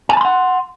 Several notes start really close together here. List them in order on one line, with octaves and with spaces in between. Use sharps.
G#5 A5 B5 C6 F#5